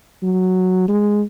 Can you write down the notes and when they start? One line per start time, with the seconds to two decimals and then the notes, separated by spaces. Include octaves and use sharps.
0.23 F#3
0.88 G#3